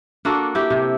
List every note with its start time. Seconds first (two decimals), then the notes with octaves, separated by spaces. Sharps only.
0.25 A#3 D4 F#4 A4
0.55 E4 G4
0.70 C3